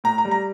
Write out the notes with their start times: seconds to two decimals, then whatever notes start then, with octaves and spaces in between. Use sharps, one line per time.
0.04 A2 A#5
0.18 A#5
0.25 G3
0.31 A#5